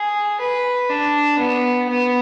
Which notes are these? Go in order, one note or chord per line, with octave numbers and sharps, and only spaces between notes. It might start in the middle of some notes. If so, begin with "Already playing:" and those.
Already playing: G#4
B4
D4
B3
B3